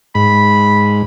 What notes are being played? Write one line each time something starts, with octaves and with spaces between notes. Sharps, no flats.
G#2 B5